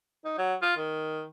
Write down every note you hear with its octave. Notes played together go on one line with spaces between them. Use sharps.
D#4
F#3
F4
D#3